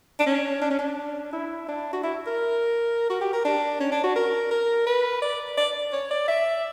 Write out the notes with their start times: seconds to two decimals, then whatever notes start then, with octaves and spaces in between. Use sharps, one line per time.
0.19 D4
0.26 C#4
0.62 D4
0.70 C#4
0.79 D4
1.33 E4
1.68 D4
1.93 F#4
2.03 E4
2.27 A#4
3.10 F#4
3.21 G4
3.33 A#4
3.45 D4
3.81 C#4
3.92 D4
4.04 F#4
4.16 A#4
4.51 A#4
4.86 B4
5.22 D5
5.57 D5
5.93 C#5
6.11 D5
6.28 E5